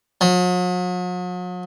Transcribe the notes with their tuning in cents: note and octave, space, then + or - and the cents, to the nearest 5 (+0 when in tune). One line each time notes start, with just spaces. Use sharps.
F#3 -45